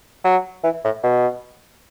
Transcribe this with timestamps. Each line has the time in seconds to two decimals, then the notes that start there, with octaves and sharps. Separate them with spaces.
0.24 F#3
0.64 E3
0.84 A2
1.03 B2